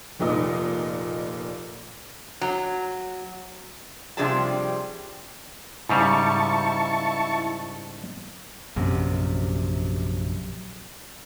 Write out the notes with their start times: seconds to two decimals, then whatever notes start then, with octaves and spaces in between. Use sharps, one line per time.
0.19 F1 A#2 D#4 D#6
2.41 F#3
4.17 C3 F3 G3 D4 G#4 A5
5.89 G#2 C#3 G3 E4 A5 C#6
8.76 A#1 F#2 C3